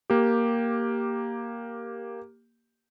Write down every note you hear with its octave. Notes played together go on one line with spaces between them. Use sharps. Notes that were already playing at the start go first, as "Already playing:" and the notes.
A#3 G4